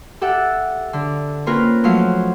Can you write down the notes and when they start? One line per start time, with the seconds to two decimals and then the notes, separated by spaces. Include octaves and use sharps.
0.21 G4 A4 E5 F#5
0.93 D3
1.46 A#3 C4 C#4 F4 A#4 B4
1.84 F3 F#3 A3 F5